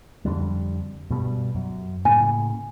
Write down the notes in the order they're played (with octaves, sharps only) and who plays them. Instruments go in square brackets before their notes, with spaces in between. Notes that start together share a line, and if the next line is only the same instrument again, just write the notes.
[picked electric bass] F2 D3 G3
G2 B2 G3
F#2
[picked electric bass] A2 C#3 A#3 [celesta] G#5